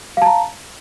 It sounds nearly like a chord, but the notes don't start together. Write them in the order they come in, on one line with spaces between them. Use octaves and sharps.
F5 A5 A#5